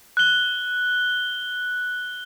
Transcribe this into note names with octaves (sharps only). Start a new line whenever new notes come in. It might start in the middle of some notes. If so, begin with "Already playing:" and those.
F#6 G7